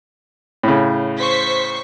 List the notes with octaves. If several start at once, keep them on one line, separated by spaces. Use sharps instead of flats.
A2 C#3
C5 C#6 B6